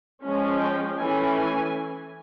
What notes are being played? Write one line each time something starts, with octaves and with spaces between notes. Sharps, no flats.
F3 G#3 C#4
G5
E3 A3 C#4 G#5
G#5